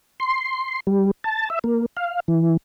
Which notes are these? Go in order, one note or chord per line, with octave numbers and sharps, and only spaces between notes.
C6
G3
A5
E5
A#3
F5
E3